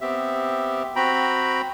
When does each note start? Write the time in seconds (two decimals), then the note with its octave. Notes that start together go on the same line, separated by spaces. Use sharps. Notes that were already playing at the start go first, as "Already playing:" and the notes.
0.01 B3 C4 G4 E5
0.96 C4 F#4 G5 A#5 B5